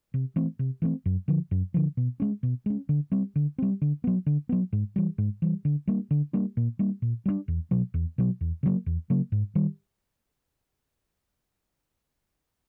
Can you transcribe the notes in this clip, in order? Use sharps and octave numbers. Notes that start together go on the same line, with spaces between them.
C3
E3 A3 C4
C3
E3 A3 C4
F#2
D3 F3
F#2
D3 F3
B2
G#3 C#4
B2
G#3 C#4
D3
G3 C4
D3
G3 C4
D3
F#3 B3
D3
F#3 B3
G#2
E3 G3
G#2
E3 G3
D3
G3 A#3 D4
D3
G3 A#3 D4
A#2
G3 A#3 D4
A#2
G3 A#3 D4
E2
B2 F#3
E2
B2 F#3
E2
C#3 F#3 A#3
E2
C#3 F#3 A#3
G#2
D#3 G3